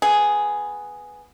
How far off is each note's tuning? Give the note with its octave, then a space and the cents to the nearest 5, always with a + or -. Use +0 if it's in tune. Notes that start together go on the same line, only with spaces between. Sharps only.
B3 +0 G#4 +0